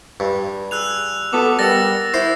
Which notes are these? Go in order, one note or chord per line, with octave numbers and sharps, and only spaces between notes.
G2
G#4 E6 F#6 F7
B3 F#4 A4 D6
G3 A#4 F#5 E6 A6 A#6
E4 C5 C7